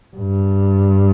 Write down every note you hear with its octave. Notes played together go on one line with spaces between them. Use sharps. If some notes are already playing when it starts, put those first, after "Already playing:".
G2